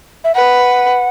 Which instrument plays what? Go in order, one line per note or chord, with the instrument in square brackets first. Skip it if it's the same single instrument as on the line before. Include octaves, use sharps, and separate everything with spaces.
[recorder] E5
[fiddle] B4 [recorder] F#5